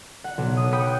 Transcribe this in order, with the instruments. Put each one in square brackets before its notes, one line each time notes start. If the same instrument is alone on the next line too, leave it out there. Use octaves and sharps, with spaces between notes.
[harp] F#5
B1
D#6
F#5 G5 B5 D#6 F#6 C#7
F#6 G6